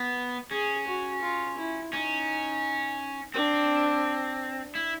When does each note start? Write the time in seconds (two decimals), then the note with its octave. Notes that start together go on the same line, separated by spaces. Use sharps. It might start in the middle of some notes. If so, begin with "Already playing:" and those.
Already playing: B3
0.51 C#4 G#4
0.87 F#4
1.22 F4
1.58 E4
1.93 C#4 D#4
3.34 C4 D4
4.75 E4